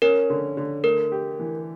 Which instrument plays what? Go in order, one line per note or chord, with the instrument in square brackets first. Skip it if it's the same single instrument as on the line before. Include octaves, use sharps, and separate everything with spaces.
[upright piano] C#4 [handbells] A#4
[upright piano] D3
D3
[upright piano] A3 [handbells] A#4
[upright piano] G4
E3